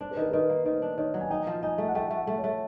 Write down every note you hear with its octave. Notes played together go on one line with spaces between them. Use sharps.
D4 C5
B4
D#3 A#4
D#3 B4
A#3
D#3 C5
D4
D#3 C#5
F#3
G#5
D#4 G5
F3
D#4 G#5
A3 F5
F#5
A3 G5
A3
F#5
A3
C#5
A3